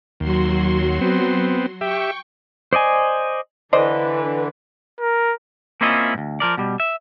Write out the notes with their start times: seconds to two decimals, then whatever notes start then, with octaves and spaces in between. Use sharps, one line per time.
0.20 D#2 F#3 F#4 C6
1.01 B3 C4
1.81 G4 E5 G5 C#6
2.73 C5 D5 D#5 G#5
3.73 D3 E3 D4 B4 C5 D5 D#5
5.00 A#4
5.81 A#3 C4 C#4 E4 F4 D#5
6.14 D2 G#2
6.40 F3 A#4 D5
6.57 B2 G3
6.80 E5